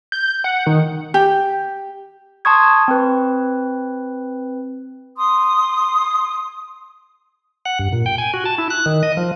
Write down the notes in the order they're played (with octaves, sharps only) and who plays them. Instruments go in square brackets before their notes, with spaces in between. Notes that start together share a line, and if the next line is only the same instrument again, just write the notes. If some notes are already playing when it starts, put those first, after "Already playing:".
[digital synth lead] G6
F#5
D#3
[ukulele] G4
[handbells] A5 C6 C#6 D#6 G#6
C4 B4
[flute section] C6 D#6
[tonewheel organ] F#5
G2
A#2
G5
G#5
F#4
A5
E4
F#6
D#3
D#5
F3